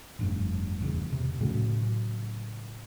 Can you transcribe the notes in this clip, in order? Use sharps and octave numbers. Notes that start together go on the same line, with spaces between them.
F1 G2
E2 C#3
C3
A2 C#3 F#3 C#4